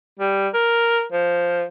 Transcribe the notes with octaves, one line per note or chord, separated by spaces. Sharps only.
G3
A#4
F3